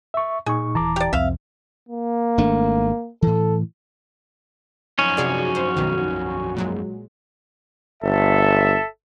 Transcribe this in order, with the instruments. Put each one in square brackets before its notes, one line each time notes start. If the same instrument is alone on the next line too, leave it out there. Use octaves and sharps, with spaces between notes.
[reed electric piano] E5 C#6
[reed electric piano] A#2 D#4 C#6 [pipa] G#4
[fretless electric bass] D#1 E3 [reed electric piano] A5 A#5 D6
[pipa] G4 D5
[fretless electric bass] C2 F2 [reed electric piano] C4 [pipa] E5 F5
[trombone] A#3
[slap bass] G#1 A3 D4
[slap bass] A2 E3 [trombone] A4
[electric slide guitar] F#2 F3 D#4 [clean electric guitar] C#4
[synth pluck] C3 G#4 D5 [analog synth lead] F#4
[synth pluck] C5
B1 D#3
A#2 F#3 G#3
[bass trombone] G1 [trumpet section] A4 E5